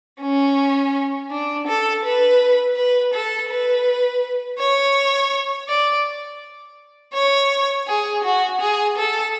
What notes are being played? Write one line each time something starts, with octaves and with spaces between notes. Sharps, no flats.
C#4
D4
A4
B4
B4
A4
B4
C#5
D5
C#5
G#4
F#4
G#4
A4